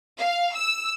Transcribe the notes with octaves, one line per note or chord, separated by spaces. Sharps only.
F5
E6